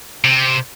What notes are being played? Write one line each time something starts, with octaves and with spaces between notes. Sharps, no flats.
C3